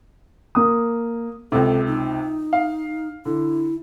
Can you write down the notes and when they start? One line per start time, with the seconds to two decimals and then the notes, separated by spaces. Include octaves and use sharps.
0.55 A#3 D#6
1.52 C#2 C3 A4
1.87 D#4
2.53 F5
3.25 D3 E4